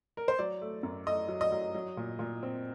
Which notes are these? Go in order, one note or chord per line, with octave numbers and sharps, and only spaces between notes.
A#4
C5
F#3 D5
A3
F#2
A3 D#5
F#3
D#5
F#3
F#3
A#2
A#2
C4